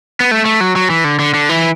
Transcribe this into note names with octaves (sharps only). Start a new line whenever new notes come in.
B3
A3
A3
F#3
F#3
E3
D3
D3
D3
E3